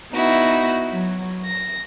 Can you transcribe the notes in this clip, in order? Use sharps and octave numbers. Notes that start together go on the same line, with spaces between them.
B3 D#4 E4 F#4
F#3
A#6